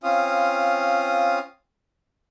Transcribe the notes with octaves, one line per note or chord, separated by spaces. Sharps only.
C4 C#4 F4 F5 D#6